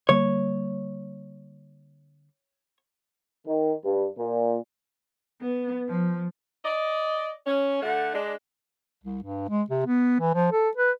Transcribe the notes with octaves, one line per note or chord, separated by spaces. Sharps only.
D3 G3 A#3 C#5
D#3
G2
A#2
B3
F3
D5 D#5
C#4
D3 A3 F#5
G#3 D4
C2
G2
G#3
C3
B3
E3
F3
A4
B4